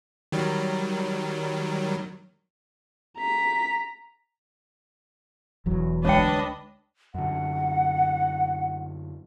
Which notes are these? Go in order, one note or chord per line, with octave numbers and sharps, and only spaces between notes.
D#3 F#3 G3
A#5 B6
E1 E2 F#3
D2 G#3 D4 B4 C#5 D#5 G5
F#2 D3 F#5